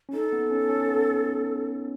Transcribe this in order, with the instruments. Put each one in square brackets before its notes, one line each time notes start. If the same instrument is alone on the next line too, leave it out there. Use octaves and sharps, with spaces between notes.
[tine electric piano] C#4
[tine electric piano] D#4 [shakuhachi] A4
[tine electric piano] B3
C#4
C#4
B3